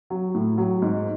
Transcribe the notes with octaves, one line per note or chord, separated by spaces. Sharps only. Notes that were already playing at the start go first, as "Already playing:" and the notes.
F#3
A2
F#3
G#2